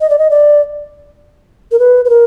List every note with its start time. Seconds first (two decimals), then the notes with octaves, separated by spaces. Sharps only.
0.01 D#5
0.10 D5
0.19 D#5
0.30 D5
1.72 A#4
1.79 B4
2.05 B4
2.09 A#4